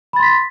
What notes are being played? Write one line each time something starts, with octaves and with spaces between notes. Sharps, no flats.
B5 C6 A6 B6